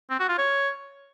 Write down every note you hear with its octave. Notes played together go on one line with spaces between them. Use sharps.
C4
F#4
F4
C#5